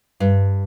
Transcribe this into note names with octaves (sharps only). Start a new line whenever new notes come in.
G2